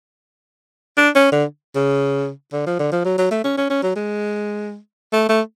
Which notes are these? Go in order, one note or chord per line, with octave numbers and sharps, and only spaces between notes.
D4
C#4
D3
C#3
D3
F3
D3
F3
F#3
F#3
A3
C#4
C#4
C#4
F#3
G#3
A3
A3